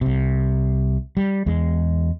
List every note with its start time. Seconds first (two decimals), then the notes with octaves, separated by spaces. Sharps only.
0.01 C2 C3
1.17 G3
1.46 E2 G#3